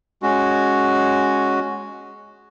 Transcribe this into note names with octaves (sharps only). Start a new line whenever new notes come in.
G#3 C#4 F#4